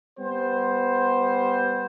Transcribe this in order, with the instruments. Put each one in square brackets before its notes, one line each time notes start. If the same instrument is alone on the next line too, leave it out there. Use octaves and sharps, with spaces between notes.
[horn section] G3 B3 C5